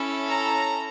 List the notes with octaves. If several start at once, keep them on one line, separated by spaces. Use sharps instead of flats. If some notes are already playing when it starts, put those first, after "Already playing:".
Already playing: C#4 E4 A4
A#5